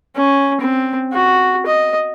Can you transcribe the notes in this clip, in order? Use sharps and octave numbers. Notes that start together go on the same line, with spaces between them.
C#4
C4
F#4
D#5